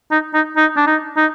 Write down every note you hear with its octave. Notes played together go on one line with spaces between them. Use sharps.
D#4
D#4
D#4
D4
D#4
D#4